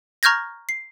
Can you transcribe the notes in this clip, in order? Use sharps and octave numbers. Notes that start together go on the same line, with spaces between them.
A#5 C#6 F6 G6 G#6 A#6
C7